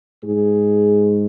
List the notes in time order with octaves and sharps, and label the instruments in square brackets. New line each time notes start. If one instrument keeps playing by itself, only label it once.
[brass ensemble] G#2 G#3 G#4